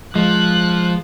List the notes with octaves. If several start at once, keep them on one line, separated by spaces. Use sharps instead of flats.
F3 G#3 F#6